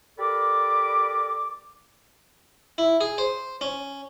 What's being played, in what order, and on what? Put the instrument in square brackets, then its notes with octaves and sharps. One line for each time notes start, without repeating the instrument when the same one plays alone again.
[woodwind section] G4 A4 A#4 D5 B5 D6
[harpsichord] E4
G#4
C5
C#4